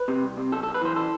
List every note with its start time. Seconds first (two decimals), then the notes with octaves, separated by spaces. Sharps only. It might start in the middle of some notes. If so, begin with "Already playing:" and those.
Already playing: B4
0.08 C3
0.23 C2
0.37 C3
0.52 B1 A4
0.63 A4
0.67 B1
0.74 B4
0.81 E3 C5
0.96 A4